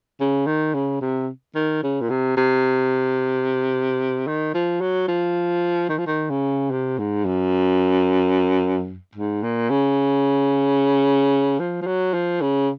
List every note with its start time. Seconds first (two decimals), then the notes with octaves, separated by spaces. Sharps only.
0.20 C#3
0.46 D#3
0.74 C#3
1.01 C3
1.55 D#3
1.83 C#3
2.01 A#2
2.10 C3
2.37 C3
4.27 D#3
4.54 F3
4.81 F#3
5.08 F3
5.89 D#3
5.98 F3
6.07 D#3
6.30 C#3
6.71 C3
6.98 G#2
7.25 F#2
9.15 G#2
9.43 A#2
9.70 C#3
11.60 F3
11.82 F3
11.87 F#3
12.14 F3
12.41 C#3